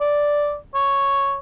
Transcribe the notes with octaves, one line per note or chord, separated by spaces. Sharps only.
D5
C#5